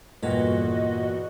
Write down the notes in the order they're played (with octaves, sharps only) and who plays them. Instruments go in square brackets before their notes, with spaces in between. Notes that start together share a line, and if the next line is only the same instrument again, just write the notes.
[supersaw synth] E2 F#4 [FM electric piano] G2 A4 B4 [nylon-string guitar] A#2 [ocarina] D#5